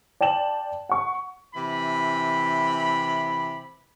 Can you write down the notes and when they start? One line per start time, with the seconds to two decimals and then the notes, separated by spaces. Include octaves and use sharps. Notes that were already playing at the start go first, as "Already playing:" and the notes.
0.21 D5 G5 A5 E7 F#7
0.89 F#5 C#6
1.54 C3 E3 B5